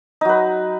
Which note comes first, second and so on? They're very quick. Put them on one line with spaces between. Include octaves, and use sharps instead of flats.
D#4 F#3 B4